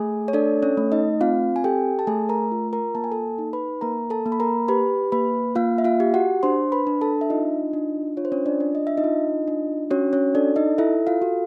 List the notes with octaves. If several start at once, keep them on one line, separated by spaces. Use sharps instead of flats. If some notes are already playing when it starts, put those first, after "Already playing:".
Already playing: A3 G#4 G#5
C#5
D4 A4 D5
C#4 C#5
A3
D#4 D#5
C4 F4 F5
G#5
G4 A4 G5
A5
A3 G#4 G#5
A#4 A#5
F4
A#4 A#5
A#3 A5
G#5
A4 A5
D#4
B4 B5
A#3 A#4 A#5
A4 A5
A#3
B5
A#4 A#5
G4 B4 B5
A#3 B4 B5
A#3 F4 F5
E5
F4 F5
G4
F#4 F#5
D4 C5 C6
B4 B5
D4
A4 A5
E5
D#4 F4 D#5
D4
F4 C#5
C5
C#4 C#5
D4 D5
D4
D#5
E5
D#4 D#5
F4
D4
C#4 F#4 C#5
C#4 C#5
D4 A4 D5
D#4 D#5
E4 A4 E5
F4 F5
F#4